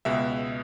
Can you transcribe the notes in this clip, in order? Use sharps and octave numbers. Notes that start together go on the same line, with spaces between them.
C#2 B2 G#3 E5